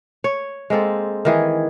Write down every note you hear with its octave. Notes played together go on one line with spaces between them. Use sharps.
C#5
G#3 A#3 C4 A4
D#3 E3 G#4